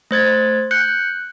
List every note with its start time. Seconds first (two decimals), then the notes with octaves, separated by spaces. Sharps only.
0.11 A3 C5 G#6 A6
0.71 F#6 G6 C#7